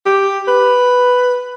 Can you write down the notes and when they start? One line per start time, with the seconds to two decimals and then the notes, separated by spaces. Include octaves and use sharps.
0.06 G4
0.48 B4